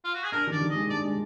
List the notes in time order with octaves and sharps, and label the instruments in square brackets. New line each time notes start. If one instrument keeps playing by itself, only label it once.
[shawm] F4
F#4
G#4
[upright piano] D4 [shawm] A#4
[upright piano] D#3 [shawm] D5
[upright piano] D#3
[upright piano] G#3 [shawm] D#5
[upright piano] D4 [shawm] D5
[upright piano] G#3